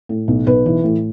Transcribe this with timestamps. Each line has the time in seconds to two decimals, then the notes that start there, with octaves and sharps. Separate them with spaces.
0.09 A2
0.28 B1
0.47 B1 B4
0.66 E3
0.84 A2